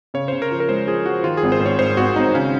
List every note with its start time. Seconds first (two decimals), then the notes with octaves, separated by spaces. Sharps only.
0.14 C#3 C#5
0.28 C#3 C5
0.42 A#4
0.51 F3
0.60 A#4
0.69 G#3 C5
0.87 F3 G#4
1.05 F3 F#4
1.24 D#3 F4
1.37 G#4
1.43 G#1
1.52 C5
1.60 G#2
1.66 C#5
1.79 G#1 C5
1.97 G#1 F#4
2.16 G#1 D#4
2.34 C#3 C#4